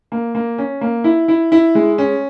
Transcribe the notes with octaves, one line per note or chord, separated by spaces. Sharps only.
A#3
A#3
C#4
A#3
E4
E4
E4
G#3
C#4